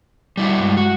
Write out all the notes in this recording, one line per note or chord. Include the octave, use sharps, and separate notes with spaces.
G3 E4 F#4
G2 G#3
F#4